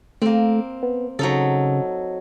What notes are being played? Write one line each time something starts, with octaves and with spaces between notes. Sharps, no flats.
A3 A#3 C4
B3
C#3 F#3 D#4 A4